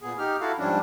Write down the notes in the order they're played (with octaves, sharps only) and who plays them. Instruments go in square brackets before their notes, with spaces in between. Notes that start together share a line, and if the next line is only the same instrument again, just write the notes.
[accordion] A#2 B3 G#4
D#4 G4 F6
E4 F#4 A4 F5
G#2 F3 G3 C#4 D4